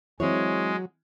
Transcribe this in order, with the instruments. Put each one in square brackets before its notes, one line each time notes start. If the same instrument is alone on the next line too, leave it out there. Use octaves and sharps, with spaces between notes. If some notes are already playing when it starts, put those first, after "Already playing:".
[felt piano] E3 [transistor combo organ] F#3 [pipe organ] G#3 [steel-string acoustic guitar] C4 G#4 C#5